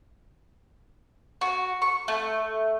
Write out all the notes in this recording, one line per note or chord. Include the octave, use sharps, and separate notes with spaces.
F#4
C#6
A3